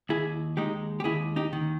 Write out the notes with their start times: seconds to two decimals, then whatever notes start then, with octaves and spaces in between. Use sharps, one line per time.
0.09 D#2 E4 G#4
0.57 G#3 D#4 G4
1.00 G4
1.04 D#2 E4 G#4
1.36 D#4 G4
1.53 D#3